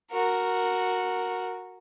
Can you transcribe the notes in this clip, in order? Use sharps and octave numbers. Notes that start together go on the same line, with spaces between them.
F#4 A#4